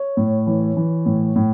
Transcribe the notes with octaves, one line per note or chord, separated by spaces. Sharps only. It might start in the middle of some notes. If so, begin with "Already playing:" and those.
Already playing: C#5
A2
E3
E3
A2
A2